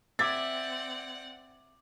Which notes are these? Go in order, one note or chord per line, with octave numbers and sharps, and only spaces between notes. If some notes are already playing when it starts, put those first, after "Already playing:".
C4 D5 E5 F#5 D6 G#6 A6